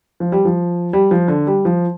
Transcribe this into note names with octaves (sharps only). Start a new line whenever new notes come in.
F3
G3
F3
G3
F3
D3
G3
F3